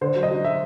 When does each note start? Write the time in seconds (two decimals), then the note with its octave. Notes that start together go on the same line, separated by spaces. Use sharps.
0.01 D3 C5
0.16 F#3
0.23 D#5
0.30 F#3
0.44 E5